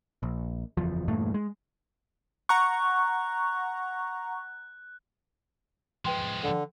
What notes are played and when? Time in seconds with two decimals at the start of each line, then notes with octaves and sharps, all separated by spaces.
0.23 A#1
0.77 F#1 E2 F3
1.08 E2 G2 A#2 A3
1.34 G#3
2.49 F#5 A#5 C#6 F#6
6.05 F3 G#3 B4 G5 C6
6.43 D3